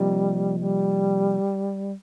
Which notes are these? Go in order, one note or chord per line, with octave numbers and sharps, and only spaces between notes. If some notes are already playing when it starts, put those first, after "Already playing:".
Already playing: C3 F3 G3 A#3 D#4
G3